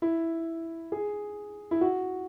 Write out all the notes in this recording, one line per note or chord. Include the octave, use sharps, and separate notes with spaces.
E4
G#4
E4
F#4